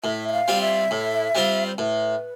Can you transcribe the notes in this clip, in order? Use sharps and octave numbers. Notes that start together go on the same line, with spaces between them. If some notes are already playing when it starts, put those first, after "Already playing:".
A2 E5
E5
F5
G3 C4 F4
E5
A2
G3 C4 F4
C5
A2 B4